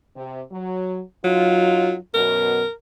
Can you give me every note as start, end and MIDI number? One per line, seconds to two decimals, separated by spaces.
0.15 0.42 48
0.51 1.01 54
1.24 1.96 42
1.24 1.96 54
1.24 1.96 63
1.24 1.96 65
2.14 2.63 42
2.14 2.63 47
2.14 2.71 70